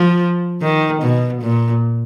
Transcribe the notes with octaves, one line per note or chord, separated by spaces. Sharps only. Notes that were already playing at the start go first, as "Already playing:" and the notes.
Already playing: F3
D#3
B2
A#2